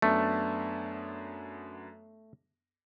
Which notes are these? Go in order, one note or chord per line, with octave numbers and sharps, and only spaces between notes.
F#2 A3 B3 D4